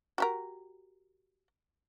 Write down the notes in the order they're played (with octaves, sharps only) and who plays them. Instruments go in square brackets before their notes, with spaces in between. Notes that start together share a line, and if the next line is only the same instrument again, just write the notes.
[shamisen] F#4 G4 A#4